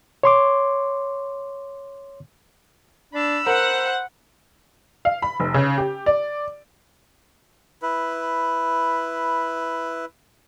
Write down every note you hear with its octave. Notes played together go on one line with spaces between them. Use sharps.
C#5 C6 D6
D4 B5 E6
A#4 C5 F#5
F5
B5
F1
C#3
G4
D5
E4 B4